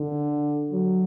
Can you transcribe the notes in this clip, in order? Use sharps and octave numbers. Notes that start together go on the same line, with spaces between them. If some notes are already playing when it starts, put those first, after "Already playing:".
Already playing: D3
F#3